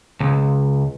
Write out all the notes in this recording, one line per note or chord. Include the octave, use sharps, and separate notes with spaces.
C#2